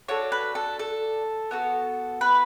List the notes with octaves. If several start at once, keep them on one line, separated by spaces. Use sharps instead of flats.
D4 F#4 A4 C#5
B4
A4
A4
B3 F#4 A4
B4